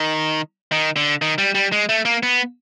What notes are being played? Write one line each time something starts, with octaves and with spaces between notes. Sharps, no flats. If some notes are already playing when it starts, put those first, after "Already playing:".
Already playing: D#3
D#3
D3
D#3
G3
G3
G#3
A3
A#3
B3